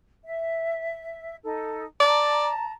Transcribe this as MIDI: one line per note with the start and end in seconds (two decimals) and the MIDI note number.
0.25 1.36 76
1.43 1.85 63
1.43 1.85 69
2.00 2.49 74
2.00 2.72 81
2.00 2.72 82